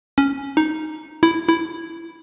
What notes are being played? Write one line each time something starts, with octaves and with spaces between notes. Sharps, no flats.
C#4
D#4
E4
E4